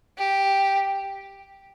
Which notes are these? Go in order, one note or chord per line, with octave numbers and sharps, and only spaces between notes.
G4